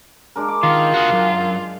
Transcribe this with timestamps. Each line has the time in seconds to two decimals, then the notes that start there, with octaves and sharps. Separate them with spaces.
0.36 G#3 D4 A#4
0.48 D6
0.63 D#3 F4
0.94 F#4 G#4
1.10 C#2 F#2